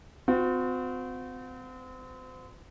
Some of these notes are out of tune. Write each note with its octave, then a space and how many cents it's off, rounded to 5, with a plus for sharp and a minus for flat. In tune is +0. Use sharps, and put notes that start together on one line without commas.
C4 -35 F#4 -45